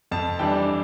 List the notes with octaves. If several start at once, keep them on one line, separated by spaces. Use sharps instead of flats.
F2 A5
E3 G3 D4 G5